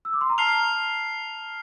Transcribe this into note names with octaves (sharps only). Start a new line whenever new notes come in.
E6
D6
C6
A#5
A5 F6 C7 F7